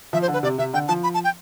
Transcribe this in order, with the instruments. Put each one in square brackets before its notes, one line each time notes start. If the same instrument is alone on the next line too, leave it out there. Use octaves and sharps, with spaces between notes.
[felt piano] F3 [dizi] E5
[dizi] C5
[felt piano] D3
[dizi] B4
[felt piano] C3 [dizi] D5
[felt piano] C3 [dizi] E5
[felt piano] D3 [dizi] G5
[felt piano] F3 [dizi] A5
[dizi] B5
A5
G5